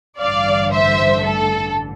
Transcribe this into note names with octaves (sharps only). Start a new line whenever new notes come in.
A1 G2 D3 D5 F5
C5 E5
A4